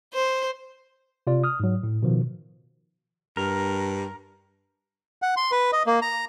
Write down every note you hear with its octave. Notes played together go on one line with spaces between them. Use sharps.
C5
C3 F4 D5
D#6 F6
G#2 F#3
A2
B2 D#3 F3
G2 A#4
F#5
C6
B4
D#5
A#3
A#5